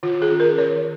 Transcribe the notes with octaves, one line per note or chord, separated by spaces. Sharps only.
D#3 F4
G#4
C#4
A#4
D#3 C#5